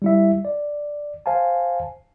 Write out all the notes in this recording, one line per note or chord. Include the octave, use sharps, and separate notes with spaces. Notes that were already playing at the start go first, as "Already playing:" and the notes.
G3 E4 E5
D5
C5 F5 G#5 A5